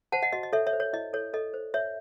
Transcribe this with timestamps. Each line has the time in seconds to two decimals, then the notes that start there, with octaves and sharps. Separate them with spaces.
0.12 C5 F#5 A5
0.22 D#5 F#5
0.33 F#4 D#5
0.43 D#5
0.53 A4 C#5 E5
0.67 C#5 E5
0.73 C5
0.80 C#5
0.93 E4 D#5
1.13 A4 C#5
1.33 A4 D#5
1.54 C5
1.74 C#5 E5